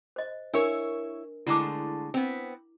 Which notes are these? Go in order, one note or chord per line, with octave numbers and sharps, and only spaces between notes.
C5 D#5
D4 E4 A#4 B4 C#5
D3 G#3 A3 E4 A#5 D6
B3 C4